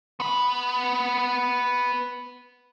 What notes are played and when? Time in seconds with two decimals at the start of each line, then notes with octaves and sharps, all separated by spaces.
0.20 B3 B5